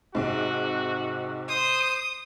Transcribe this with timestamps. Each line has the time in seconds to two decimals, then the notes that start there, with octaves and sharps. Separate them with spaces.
0.15 G#2 C3 C4 F#4
1.49 C5 D#6